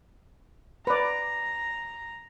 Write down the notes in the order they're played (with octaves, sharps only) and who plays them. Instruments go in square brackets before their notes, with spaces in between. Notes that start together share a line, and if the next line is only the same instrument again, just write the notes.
[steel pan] B4 D5 [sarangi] A#5